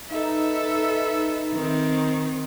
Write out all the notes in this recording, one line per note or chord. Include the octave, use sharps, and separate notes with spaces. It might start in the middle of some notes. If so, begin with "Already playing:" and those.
D#4 A4 B4 E5
D#3 C4